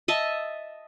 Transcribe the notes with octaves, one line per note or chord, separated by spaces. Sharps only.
D#5 E5 A5